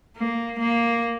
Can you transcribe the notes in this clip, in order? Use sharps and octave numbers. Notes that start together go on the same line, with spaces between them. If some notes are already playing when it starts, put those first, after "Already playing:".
A#3
A#3